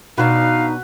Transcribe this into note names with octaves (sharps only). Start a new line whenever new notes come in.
B2 D4 D#4 F#4 B4 F5